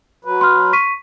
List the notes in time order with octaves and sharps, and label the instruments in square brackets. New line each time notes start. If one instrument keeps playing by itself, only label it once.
[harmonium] F#3 B4
[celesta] C6 F6
C#6 B6 D#7